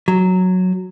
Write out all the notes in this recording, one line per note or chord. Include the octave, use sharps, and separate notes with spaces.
F#3